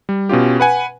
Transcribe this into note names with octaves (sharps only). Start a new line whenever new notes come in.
G3
B2 C#4 F4 G4
B4 F#5 G#5